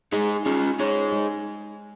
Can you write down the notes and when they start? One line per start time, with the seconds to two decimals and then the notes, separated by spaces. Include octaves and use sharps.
0.12 G#3 D#4 G#4
0.46 G#3 C#4 F4
0.79 D#4 G#4 C#5
1.12 G#3